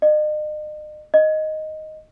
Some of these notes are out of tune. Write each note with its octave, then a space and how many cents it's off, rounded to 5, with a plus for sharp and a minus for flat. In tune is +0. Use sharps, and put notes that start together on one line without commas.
D#5 -40
D#5 +0